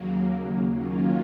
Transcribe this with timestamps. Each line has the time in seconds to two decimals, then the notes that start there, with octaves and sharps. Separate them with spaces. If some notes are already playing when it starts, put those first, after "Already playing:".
Already playing: D#2 C#3 F#3 A#3
0.67 D#3 F#3 A#3 C#4 F4